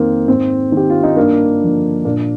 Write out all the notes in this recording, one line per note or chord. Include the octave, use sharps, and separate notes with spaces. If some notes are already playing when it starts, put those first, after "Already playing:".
Already playing: F2 D#3 A#3 C4
G#2 C4
D#3 G4
F4
D#4
G2 A#3 D4
D3 F3
A#2 A#3 D4